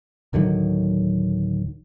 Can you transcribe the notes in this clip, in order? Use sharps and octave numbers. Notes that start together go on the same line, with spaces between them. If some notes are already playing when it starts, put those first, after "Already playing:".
D1 D3 D#3 F#3